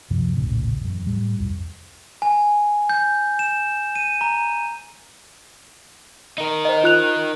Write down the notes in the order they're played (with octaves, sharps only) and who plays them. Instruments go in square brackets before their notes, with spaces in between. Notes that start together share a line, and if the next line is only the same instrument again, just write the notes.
[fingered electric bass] C#2 F#2 C3 F3
D#1 A#1 A2 C#3
A#1
E1 F#2
A2 G3
C2 F2
[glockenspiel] G#5
G6
E7
D#7
A#5
[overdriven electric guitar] D#4 A#4
[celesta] C5 D#5
F4 F#6 F7